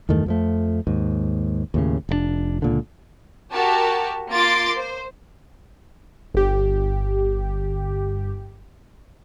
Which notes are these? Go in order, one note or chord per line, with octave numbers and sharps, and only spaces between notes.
E2 G2 D#3 A3
F2 F3 A3
D#2 G#2
D#2 A2 C#3
F1 G#2 D4
C#2 A#2 D3
F#4 G4 A#4 A5
A#3 F4 C6 D6 A6 D7
C5
G1 G4